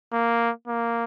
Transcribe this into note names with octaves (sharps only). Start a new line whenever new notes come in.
A#3
A#3